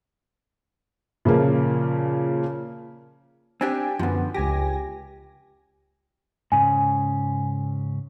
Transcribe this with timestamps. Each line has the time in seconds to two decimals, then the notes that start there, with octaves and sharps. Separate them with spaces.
1.25 A#2 C#3 F3 A#3
3.61 C4 D4 G4 G5 G#5
3.99 F#2 D3 F3 B3
4.34 C#2 G4 G#5 A#6
6.52 G#2 C#3 G#5